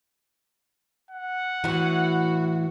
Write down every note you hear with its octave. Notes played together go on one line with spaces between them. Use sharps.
F#5
A2 E3 F#4